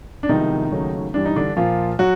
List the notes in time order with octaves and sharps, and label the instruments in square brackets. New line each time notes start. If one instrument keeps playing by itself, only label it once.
[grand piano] D4
C2 C3 D#3 F3 G#3 B3 D#4
D#2 C#3 F#3 A3
G2 E3 G3 D4
D#4
D3 D4
A#2 F3 A#3 F4
F#3 F#4